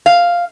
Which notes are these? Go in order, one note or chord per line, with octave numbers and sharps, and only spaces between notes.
F5